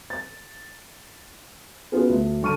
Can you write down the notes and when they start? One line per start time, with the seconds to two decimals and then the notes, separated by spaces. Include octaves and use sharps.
0.10 A6
1.92 B3 C#4 F4 F#4 G#4 B4
2.09 D2
2.42 D3 A5 C#6 F6 D#7